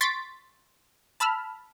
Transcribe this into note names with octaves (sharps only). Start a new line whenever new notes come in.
C6 C#6 A6 B6 D7
A5 B5 E6 F6